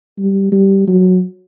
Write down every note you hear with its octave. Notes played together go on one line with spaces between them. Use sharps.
G3
G3
F#3